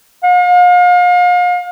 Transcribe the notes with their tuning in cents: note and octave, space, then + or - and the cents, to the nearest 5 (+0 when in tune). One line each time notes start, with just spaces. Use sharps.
F5 +40